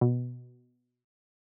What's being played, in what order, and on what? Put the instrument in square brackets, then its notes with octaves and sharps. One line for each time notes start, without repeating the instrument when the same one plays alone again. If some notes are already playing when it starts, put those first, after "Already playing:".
[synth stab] B2